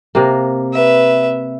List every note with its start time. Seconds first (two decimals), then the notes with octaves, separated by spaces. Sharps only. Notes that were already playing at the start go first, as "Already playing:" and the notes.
0.15 C3 A#3
0.73 B4 E5